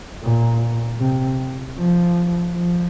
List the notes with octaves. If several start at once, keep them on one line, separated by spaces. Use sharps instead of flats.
A#2
C3
F3
F3